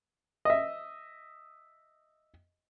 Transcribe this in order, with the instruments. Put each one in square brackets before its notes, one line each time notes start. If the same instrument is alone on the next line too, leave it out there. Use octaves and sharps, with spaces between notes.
[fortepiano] D#5 E5